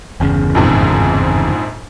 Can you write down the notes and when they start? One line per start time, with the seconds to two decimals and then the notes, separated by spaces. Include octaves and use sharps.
0.20 G1 E2 C#3
0.55 A#1 F2 G#2